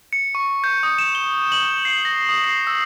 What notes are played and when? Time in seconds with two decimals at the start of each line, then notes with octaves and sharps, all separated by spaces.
0.13 C#7
0.35 C#6
0.64 G6
0.83 D#6
0.98 E7
1.15 G7
1.52 F#7
1.85 C7
2.05 A#6
2.29 D#6
2.44 C7
2.67 E6